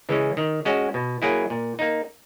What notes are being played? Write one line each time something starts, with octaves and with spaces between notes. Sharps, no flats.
C#3 E3 G#3 C#4
D#3
G#3 C#4 F#4
B2
F#3 A#3 E4 G#4
A#2
A#3 D#4